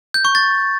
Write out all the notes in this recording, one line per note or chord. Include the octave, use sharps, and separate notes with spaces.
G6
C#6
A6